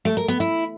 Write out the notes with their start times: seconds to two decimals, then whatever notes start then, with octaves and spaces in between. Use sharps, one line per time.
0.05 A3
0.17 A#4
0.28 B3
0.40 E4